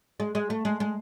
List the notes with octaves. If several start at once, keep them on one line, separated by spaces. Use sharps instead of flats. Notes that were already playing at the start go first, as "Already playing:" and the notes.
G#3
G#3
A3
G#3
G#3